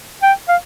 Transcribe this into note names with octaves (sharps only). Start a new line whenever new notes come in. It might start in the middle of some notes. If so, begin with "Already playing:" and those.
G5
F5